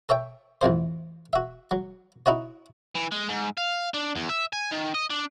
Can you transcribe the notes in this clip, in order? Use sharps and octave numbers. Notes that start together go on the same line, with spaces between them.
A4 C#5 E5 G5
A1 F2 C3 C5
F#4 E5
F#3
D#4 E4 F#4 C#5
E3
G#3
G#2
F5
D4
E2
E5
G#5
D#3
D#5
D4